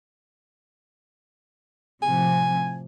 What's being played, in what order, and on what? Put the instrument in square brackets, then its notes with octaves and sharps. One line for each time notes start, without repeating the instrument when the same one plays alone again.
[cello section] A2 C3 F3 [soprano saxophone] G#5